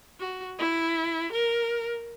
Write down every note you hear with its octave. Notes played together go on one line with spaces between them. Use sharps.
F#4
E4
A#4